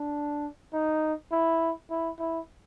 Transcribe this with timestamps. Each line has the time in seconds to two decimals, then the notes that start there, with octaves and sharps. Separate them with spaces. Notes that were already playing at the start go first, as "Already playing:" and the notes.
Already playing: D4
0.73 D#4
1.32 E4
1.90 E4
2.19 E4